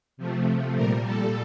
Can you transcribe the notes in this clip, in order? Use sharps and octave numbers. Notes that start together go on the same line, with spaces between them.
C3 F3 A3
A#2 G3 A#4
A4